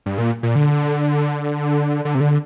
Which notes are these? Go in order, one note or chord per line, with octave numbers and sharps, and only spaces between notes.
G2
A#2
A#2
D3
D3
C3
D3